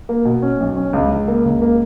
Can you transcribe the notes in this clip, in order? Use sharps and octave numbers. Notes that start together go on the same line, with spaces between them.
A#3
B2
C#4
B1
C#4
C#2
C#2
A#3
C#2
A#3